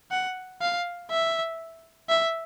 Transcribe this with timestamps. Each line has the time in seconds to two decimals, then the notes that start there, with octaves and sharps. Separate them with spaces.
0.11 F#5
0.62 F5
1.11 E5
2.09 E5